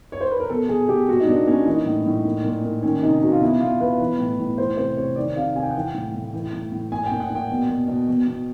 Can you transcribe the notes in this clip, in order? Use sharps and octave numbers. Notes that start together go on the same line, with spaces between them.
C#5
C5
B4
A#4
B2 A4
B2 G#4
B2 G4
A#2 F#4
D#4
A#2 D4
A#2 C#4
E3 D#4
A2
A2
A#2
A#2
A#2
D#3 C#4
C3 D#4
C3 F#4
F4
B2 E4
B2 F4
B2 B4
E3
A2
A2
E3 C5
C3 C5
C3 C#5
D#3 D5
C3 F5
C3 G#5
G5
F#5
E3 G5
A2
A2
E3
A2
A2
A#2 G#5
G5
A#2
F#5
A#2 G5
B2
B2
B2
B2
B2